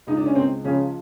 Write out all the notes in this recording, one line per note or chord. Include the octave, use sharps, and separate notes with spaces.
C#2 D#4
D4
C#4
C#2 C4
C#3 F3 C#4